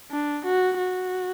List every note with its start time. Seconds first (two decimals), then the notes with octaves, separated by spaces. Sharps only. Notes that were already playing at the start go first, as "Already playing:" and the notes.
0.11 D4
0.45 F#4
0.79 F#4